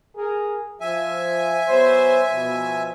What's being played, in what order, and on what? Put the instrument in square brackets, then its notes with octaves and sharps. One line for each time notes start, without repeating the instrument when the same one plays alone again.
[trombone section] G#4 A#4
[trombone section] F3 [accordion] E5 G#5
[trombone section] F#3 B3 C5
B2 F3